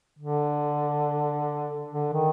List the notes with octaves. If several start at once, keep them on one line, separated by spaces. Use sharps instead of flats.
D3
D3
D#3